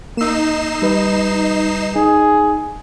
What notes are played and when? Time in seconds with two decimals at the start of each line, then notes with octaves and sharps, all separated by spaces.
0.17 A#3 D#4 E6 C7 E7
0.82 G3 B4
1.96 D#4 G#4